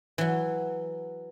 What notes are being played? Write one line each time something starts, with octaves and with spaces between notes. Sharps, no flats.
E3 F#3